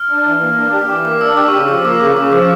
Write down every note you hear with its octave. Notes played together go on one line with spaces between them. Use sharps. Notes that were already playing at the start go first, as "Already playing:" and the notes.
Already playing: F6
D4
E3
A#3
D4
G4
E3 D6
A#3 D6
D4 E6
G4 D6
C#6
C#3 D6
F3 E6
A#3 D6
C#3 D6
C#3 D6
F3 D6